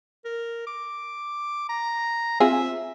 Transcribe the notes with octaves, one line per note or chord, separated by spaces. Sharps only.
A#4
D6
A#5
C4 F4 G#4 E5